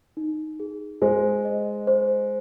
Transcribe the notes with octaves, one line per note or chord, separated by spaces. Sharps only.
D#4
G#4
G#3 C5
D#5
C5